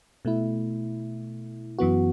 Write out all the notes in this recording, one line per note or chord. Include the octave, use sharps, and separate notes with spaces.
B2 A3 E4
F#2 E3 B3 F#4